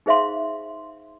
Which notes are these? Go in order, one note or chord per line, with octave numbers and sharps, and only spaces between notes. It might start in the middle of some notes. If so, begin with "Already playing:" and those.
D#4 G#4 C5 E5 F5 C6